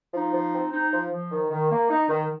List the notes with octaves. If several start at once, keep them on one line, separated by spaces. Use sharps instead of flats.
F3 D#4
F3
C4
D#4
F3
F3
D#3
D#3
A#3
D#4
D#3